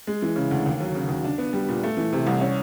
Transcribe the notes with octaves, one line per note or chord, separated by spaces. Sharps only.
G#3
E3
C#3
D2
D#2
F#3
C#3
D#2
D4
B3
G3
A#2
A3
E3
C3
C2
C#4